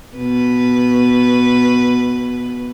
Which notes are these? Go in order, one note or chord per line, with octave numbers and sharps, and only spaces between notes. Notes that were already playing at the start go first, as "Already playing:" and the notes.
B2 B4